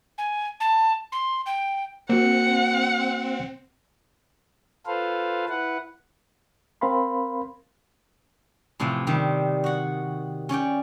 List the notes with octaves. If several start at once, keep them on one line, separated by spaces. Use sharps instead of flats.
G#5
A5
C6
G5
A#3 C4 F#4 F#5
F4 A4 B4 C5 F5
E4 B4 F#5
C4 A#4 F5 B5 C6
A2 C3 E3 F3
C3 D#3 G3
F#4 F#5
C#4 C#5 D5 G5